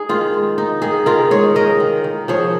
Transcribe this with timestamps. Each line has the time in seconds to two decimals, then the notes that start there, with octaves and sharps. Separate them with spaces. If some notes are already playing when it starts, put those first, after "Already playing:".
Already playing: D#4 G#4
0.09 D#3 F4
0.34 G#3
0.58 D#4
0.82 D#3 G#4
1.06 D#3 F4 A#4
1.31 G#3 G#4 C#5
1.55 D#4 A#4 D#5
1.80 D#3
2.04 D#3
2.28 F3 G#4 C#5